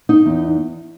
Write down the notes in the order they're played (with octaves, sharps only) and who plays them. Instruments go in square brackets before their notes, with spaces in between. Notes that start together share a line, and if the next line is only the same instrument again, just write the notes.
[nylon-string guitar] D#4
E2